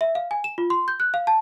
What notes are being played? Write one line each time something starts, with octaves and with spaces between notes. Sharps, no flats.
E5
F5
G#5
E7
F4
C6
G6
F#6
F5
A5